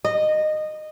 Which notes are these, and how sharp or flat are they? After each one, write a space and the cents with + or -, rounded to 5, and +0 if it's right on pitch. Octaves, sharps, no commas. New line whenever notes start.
D#5 -15